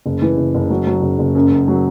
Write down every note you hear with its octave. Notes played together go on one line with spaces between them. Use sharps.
F#1
E3
F#1
F#1
F#3
F#3
F#1
F#1
F#2
F#2
F#3